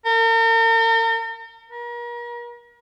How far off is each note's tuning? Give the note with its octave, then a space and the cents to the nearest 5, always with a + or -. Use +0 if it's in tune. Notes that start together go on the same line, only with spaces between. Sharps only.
A#4 -40
A#4 +40